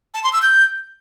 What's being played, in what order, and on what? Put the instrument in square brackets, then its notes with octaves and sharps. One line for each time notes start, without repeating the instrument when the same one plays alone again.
[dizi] A5
C6
E6
G6